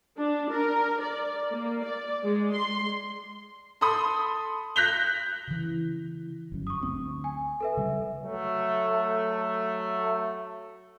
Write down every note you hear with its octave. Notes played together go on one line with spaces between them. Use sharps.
D4
A#4
D5
A#3
D5
G#3
C6
A4 B5 C6 D#6
F#6 G6 A#6 B6 F7 G7
C#3 E3
G1 F#2
C#6 D#6
D2 C4
G#5
A4 B4 E5
C#3 G3
F#3 A3